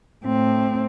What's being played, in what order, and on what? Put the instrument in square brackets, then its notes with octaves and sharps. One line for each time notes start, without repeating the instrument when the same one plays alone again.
[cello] A2 C4